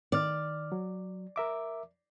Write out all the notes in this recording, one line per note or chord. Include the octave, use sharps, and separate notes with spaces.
D#3 D5 F6
F#3
A#4 E5 D6